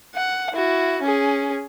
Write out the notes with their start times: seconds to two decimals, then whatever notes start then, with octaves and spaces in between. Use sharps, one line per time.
0.15 F#5
0.53 E4 F#4
1.02 C#4 G#4